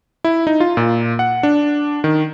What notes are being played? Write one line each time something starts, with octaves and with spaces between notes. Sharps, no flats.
E4
D#4
F4
A#2
F#5
D4
D#3